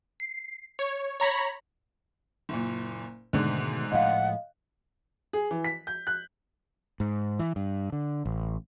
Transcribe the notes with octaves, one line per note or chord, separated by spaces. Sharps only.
C7
C#5
C#5 A#5 B5
F#1 A#2
G#2 B2 D3 D#3 A3
A2 F3 G#3 D#5 F5 F#5
G#4
E3
B6
G6
F#6
G#2
E3
G2
D3
A1